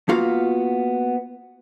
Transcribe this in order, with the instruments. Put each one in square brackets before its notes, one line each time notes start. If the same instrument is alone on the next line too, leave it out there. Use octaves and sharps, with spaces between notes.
[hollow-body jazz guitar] A#3 B3 F4 F#4 F5